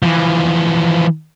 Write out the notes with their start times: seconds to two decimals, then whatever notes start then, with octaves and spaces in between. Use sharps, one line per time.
0.03 E3 F3